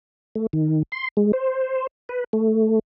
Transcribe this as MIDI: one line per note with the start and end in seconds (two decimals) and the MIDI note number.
0.35 0.47 57
0.53 0.83 51
0.92 1.08 84
1.17 1.32 56
1.33 1.87 72
2.09 2.24 71
2.33 2.79 57